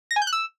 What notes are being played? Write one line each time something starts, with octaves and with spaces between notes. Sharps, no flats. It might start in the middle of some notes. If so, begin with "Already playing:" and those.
A#6
G#5
G6
F#6
E6